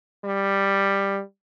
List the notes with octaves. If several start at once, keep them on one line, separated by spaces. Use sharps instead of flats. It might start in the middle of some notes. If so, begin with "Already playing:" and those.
G3